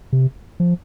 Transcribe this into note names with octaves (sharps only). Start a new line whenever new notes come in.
C3
F3